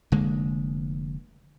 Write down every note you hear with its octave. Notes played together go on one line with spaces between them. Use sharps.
F1 D3 G#3 A#3